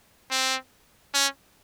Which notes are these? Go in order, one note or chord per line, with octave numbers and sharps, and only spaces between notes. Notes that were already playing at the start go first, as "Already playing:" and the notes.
C4
C#4